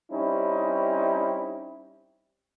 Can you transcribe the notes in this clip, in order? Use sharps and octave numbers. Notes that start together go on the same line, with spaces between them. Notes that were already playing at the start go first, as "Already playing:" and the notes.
G3 C4 C#4 D#4 E4